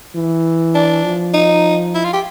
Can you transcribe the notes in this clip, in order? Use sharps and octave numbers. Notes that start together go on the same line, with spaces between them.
E3
D4
F3
D#4
E4
F4
G4